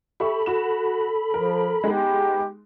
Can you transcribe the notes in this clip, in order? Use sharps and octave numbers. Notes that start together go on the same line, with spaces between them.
G4 A4 E5 B5 C#6
F#4 E7
F3 A#4
G#3 B3 D#4 G4